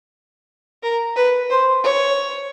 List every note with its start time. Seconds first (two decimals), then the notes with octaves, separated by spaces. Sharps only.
0.83 A#4
1.16 B4
1.50 C5
1.83 C#5